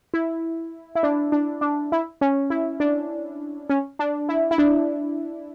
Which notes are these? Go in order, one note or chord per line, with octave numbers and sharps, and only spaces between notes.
E4
E4
D4
D4
D4
E4
C#4
E4
D4
C#4
D4
E4
E4
D4